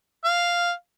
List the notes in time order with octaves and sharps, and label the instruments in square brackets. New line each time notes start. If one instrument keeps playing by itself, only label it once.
[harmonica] F5